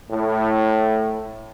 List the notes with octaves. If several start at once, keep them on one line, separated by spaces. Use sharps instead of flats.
A2